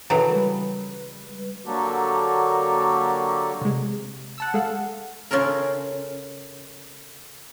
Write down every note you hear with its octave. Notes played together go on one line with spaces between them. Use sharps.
C#3 E3 F#3 A4 A#4 G5
G3 G#3 B4
D3 F#3 A#3 F#4 G4 A4
C3 G#3
F#5 A5 E6
G#3 A4 F5 F#5
C#3 C#4 F4 A4 A#4